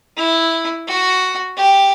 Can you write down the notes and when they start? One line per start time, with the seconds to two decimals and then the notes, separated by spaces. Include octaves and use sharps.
0.17 E4
0.87 F#4
1.57 G4